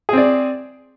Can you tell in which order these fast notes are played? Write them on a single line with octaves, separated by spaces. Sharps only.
G#4 C4 D5